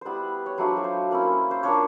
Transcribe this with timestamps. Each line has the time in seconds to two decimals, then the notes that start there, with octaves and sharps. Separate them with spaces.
0.01 G3 B3 E4 B4 C5
0.46 C#5
0.58 F#3 A3 D4 F4 C5
0.77 C#5
0.84 C5
1.11 A#3 C#4 E4
1.51 C5
1.63 A#3 D4 F4 C#5